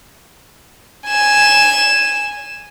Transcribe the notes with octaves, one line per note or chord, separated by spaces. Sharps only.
G#5 E7